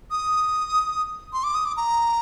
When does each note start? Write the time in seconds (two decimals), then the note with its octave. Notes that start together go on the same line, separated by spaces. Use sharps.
0.11 D#6
1.33 C6
1.44 D6
1.55 D#6
1.65 D6
1.77 A#5